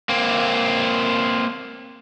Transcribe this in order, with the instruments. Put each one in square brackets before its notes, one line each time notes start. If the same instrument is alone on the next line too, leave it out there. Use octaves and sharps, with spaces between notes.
[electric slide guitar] A#3 C4